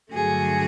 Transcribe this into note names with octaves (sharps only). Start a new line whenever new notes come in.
G2 D3 F#3 A3 F#4 G#4